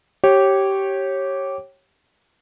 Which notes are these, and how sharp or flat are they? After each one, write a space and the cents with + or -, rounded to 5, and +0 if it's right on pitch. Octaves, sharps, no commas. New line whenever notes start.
G4 -15 C#5 -20